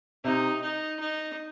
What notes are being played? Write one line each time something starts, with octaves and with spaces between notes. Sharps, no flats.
C3 D#4
D#4
D#4